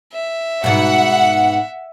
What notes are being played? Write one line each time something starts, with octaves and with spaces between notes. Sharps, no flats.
E5
G#2 B2 F#5